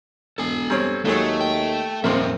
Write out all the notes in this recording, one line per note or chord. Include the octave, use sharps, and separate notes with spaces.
E1 A4 G#5
G2 C4 C#5
D#2 F#3 G#3 A3 C#5
G5
D#1 F2 A#2 A#3 C4 E5